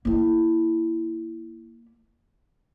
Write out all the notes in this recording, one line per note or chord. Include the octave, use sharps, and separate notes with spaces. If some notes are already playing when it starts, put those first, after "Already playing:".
A#3 E4